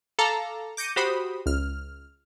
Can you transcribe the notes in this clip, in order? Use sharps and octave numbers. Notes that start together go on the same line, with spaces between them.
A4 F5 A5 A#5 D6
D6 G6 A#6 C#7 D#7
F#4 G4 C5 B5 D#6
C#2 F6